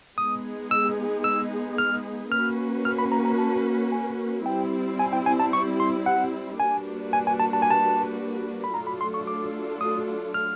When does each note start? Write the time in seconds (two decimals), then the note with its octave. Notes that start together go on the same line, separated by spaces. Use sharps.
0.18 G#3 B3 D#4 G#4 D#6
0.71 E6
1.24 E6
1.78 F6
2.32 A#3 C#4 F#4 B4 F6
2.85 F6
2.99 B5
3.12 A#5
3.25 A#5
3.38 A5
3.92 G#5
4.46 G3 C4 E4 G5
4.99 G#5
5.13 G5
5.26 G#5
5.40 A5
5.53 C#6
5.80 C6
6.06 F#5
6.60 G3 A#3 D4 F#4 B4 G#5
7.13 G#5
7.27 G#5
7.40 A5
7.53 A5
7.62 G#5
7.70 A5
8.64 B5
8.74 F#3 A3 D4 F4 A4 A#5
8.87 B5
9.01 C6
9.14 C#6
9.27 D6
9.81 D#6
10.34 F6